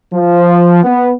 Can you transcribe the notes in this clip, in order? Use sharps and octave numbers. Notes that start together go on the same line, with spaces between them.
F3
B3